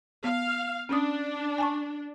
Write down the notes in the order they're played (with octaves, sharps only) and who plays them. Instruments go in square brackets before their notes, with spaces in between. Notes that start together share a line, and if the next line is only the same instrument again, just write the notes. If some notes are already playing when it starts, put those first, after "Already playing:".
[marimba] B3 [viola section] F5
[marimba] C#4 D#6 [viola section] D4
[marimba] G#5 A5 C#6